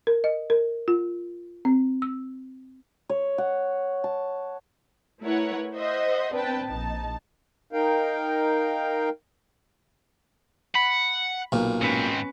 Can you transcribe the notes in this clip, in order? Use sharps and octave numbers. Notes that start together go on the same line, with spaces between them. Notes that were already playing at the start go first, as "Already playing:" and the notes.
A#4
D#5
A#4
F4
C4
E6
C#5
F#5
A5
A3 E4 A#4 B4 C#5 F#5
C5 D#5 E5 F#5 C6
B3 C4 D4 B4 G5 A5
A#1 D#4 A5
D#4 A#4 F5 G5
F#5 B5
B1 A#2
G#2 C4 C#4 B4